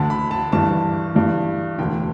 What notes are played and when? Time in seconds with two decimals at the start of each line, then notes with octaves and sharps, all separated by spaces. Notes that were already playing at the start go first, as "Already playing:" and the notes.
Already playing: D2 D3 A5
0.10 B5
0.31 A5
0.52 G1 G2 E3 A5
1.15 G1 G2 E3
1.78 E1 D2 D3 G5